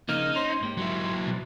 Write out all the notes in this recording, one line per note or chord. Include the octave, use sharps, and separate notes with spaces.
C#3 F3 A#3 D#4 F6
C#4 C5 C6
G#2 A#3 G4
F#3 E4
B2